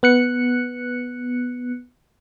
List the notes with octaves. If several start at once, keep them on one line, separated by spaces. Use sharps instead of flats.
B3 F#6 C#7